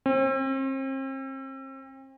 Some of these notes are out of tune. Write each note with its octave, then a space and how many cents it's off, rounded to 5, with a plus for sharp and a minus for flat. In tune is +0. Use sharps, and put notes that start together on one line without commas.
C4 +40